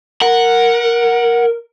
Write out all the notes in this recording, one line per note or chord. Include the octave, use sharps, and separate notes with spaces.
A#4 F#5